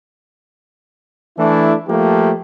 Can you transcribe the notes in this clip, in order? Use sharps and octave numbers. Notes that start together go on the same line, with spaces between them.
E3 A3 D4 E4
F3 A3 A#3 G4